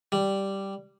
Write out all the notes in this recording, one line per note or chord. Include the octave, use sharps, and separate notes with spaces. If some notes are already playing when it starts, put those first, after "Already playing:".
G3